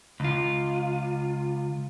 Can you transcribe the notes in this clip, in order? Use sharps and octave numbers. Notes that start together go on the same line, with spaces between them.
C#2 F4